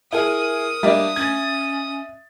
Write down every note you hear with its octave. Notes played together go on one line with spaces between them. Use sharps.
E4 G#4 A#4 D#6
G3 A#3 D4 D#5 E5
C#4 G#6 A6